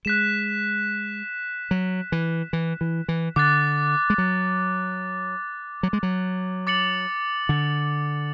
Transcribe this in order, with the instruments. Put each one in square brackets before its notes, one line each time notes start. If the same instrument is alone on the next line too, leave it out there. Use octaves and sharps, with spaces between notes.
[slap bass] G#3 [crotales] F#6 B6 E7
[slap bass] F#3
E3
E3
E3
E3
[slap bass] D3 [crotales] D6 F#6 A6
[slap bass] G#3
F#3
F#3
G#3
F#3
[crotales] D6 A6 C#7 F#7
[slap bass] D3